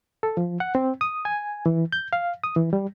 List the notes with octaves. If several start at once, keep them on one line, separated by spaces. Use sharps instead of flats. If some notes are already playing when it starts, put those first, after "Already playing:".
A4
F3
F#5
C4
D#6
G#5
E3
G6
F5
D#6
E3
G3